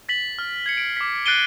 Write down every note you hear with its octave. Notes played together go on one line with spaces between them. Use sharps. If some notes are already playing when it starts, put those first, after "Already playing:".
A6 B6 F#7
F6
G#6 C7 C#7
C7 D7
D6 B6
F#6 A6 C7 D7 D#7 G7